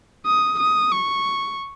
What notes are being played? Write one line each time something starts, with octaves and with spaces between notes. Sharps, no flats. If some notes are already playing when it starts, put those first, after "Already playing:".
D#6
D#6
C#6